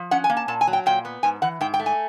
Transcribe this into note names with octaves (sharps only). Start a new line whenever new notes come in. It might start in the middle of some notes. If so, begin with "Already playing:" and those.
Already playing: F3
C#4 F#5
G#5
A#3
A5
A#2 A5
G#5
F#3
G5
A#2 G5
B3
G#2 G#5
E3 F#5
G#2 G5
G5
A3
G#5